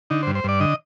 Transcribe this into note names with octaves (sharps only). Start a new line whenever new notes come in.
D3 D#4
C5
G2
C5
G2 D5
D3 D#5